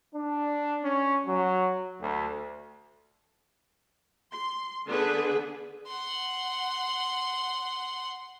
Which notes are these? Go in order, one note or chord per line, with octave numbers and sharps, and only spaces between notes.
D4
C#4
F#3
D2
C6
D3 B3 D4 G#4 B4
F#5 C6